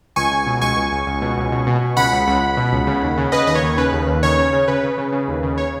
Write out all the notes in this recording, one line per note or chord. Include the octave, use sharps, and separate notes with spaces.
C#2 G#5 C#6
C#2
B2
C#2 G#5 C#6
C#2
C#2
C#2
B2
C#2
B2
B2
B2
C#2 F#5 B5
C#2
C#2
C#2
B2
C#2
C#3
D#2
C#3
C#3 B4 D#5
D#2 D#5
C#5
D#2
C#3 B4
D#2
D#2
C#3 C#5
C#3
C#3
C#3 B4
C#3
C#3
C#3
D#2
C#3
C#5